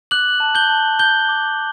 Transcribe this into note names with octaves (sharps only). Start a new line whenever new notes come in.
D6 F#6 F#7
A5
G6 G7
A5
G6 G7
D6